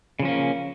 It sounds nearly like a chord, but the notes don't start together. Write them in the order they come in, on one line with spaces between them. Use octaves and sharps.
C#3 F3 C#4 A#3